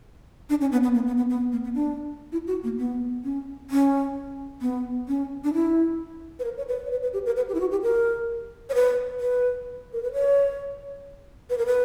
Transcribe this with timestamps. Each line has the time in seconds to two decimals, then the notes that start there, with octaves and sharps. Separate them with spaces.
0.50 D4
0.61 C#4
0.72 B3
0.83 B3
0.94 A#3
1.07 B3
1.17 B3
1.30 B3
1.52 A#3
1.64 B3
1.75 D4
2.32 E4
2.47 F#4
2.64 A#3
2.78 B3
3.24 C#4
3.71 C#4
4.62 B3
5.08 C#4
5.44 D4
5.54 E4
6.39 B4
6.44 A#4
6.57 C#5
6.69 B4
6.86 C#5
6.91 B4
7.03 B4
7.13 G4
7.26 A#4
7.36 B4
7.49 G4
7.55 E4
7.60 F#4
7.71 G4
7.83 A#4
8.69 C#5
8.75 B4
9.20 B4
9.93 A#4
10.03 B4
10.13 C#5
11.50 B4
11.58 A#4
11.66 B4